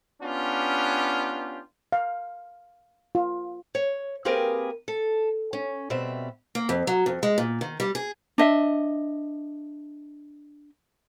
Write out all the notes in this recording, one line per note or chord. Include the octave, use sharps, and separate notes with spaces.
B3 C#4 D4 F4 G4
F5
F4
C#5
A#3 C4 G4 G#4 A#4 B4
A4
C#4
B2 G3 C4 E5
A#3
F2
F#3
F2
G#3
A#2
D#3
G3
G#4
D4 D#5 E5